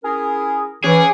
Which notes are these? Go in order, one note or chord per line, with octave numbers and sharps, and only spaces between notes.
C#4 E4 G#4 A#4
E3 C#4 G#4 F#5 D6